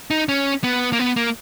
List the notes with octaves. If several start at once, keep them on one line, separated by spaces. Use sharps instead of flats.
D#4
C#4
B3
A#3
B3
A#3